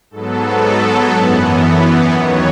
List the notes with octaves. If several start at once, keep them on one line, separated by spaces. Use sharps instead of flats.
G#2 F#3 B3 A4
F#2 E3 B3
D#2 D#3 F#3 B3 C#5